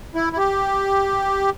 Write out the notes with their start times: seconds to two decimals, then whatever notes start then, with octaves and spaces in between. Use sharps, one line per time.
0.15 E4
0.33 E4
0.38 G4